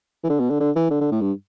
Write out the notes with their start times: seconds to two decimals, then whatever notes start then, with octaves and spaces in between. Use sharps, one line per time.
0.24 E3
0.30 D3
0.40 B2
0.50 D3
0.60 D3
0.76 E3
0.90 D3
1.01 D3
1.11 A2
1.21 G2